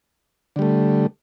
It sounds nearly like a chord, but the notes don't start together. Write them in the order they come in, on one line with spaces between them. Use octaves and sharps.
D3 G3 A3